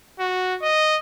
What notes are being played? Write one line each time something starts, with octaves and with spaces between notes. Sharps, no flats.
F#4
D#5